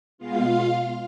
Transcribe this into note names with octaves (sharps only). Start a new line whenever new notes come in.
B2 G#3 B3 F4 F5